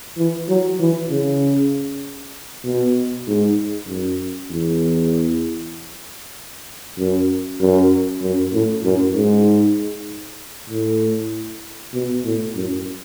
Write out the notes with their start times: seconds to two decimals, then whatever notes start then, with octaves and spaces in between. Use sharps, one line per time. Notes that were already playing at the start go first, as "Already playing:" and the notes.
0.17 E3
0.48 F#3
0.79 E3
1.10 C#3
2.65 B2
3.27 G#2
3.88 F#2
4.51 E2
6.98 F#2
7.60 F#2
8.22 F#2
8.53 A2
8.84 F#2
9.15 G#2
10.70 A2
11.94 B2
12.25 A2
12.55 F#2